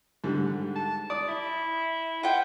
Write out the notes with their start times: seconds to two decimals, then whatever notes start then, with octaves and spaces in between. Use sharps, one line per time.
0.24 G#2 D3 G3
0.76 A5
1.10 D5 D#6
1.29 E4
2.23 F4 F#5 G5